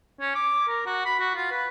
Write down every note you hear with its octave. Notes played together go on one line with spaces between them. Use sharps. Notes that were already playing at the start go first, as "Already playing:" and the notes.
C#4
D6
A#4
F#4
B5
F#4
F4
B4